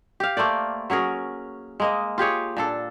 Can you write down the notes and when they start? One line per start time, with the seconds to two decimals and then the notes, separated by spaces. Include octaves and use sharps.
0.20 G4 F5
0.37 A3 A#3 C5 D5
0.90 F#3 C#4 G#4 A#4
1.80 G#3 A#3 D#5
2.18 F4 G4 G#4 C#5
2.57 A#2 D4 A4